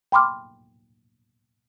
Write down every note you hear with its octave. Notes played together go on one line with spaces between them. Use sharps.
G5 B5 C6 D6 F6